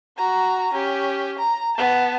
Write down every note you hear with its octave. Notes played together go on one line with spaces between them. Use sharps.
F#4 A#5
C#4 G4
A#5
B3 A5